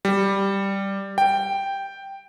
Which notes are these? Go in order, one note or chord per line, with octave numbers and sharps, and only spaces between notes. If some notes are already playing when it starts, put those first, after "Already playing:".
G3
G5